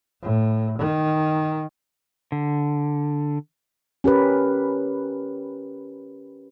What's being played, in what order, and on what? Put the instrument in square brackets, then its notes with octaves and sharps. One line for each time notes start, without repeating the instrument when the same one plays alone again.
[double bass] A2
D#3
[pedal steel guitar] D3
[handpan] C#4 G4 A#4 B4